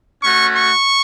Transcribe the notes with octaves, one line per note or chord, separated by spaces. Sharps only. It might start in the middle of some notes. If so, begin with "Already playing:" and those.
A3 C#4 F#4 C#6
C#6